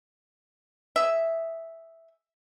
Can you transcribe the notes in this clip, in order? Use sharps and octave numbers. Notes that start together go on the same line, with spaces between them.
G#4 E5